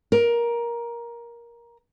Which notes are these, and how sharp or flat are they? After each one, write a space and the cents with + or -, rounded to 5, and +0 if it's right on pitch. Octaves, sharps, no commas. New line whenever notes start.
A#4 +15